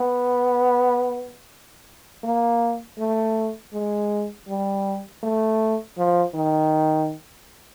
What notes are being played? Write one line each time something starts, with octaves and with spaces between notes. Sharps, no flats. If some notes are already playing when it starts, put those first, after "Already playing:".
Already playing: B3
A#3
A3
G#3
G3
A3
F3
D#3